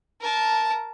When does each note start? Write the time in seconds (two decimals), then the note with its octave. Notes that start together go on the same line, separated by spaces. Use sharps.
0.21 A#4 A5